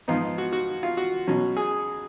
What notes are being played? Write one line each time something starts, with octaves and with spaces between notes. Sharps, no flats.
G#2 F3 B3 D#4 F4
F#4
F#4
F4
F#4
B2 F#3 C#4
G#4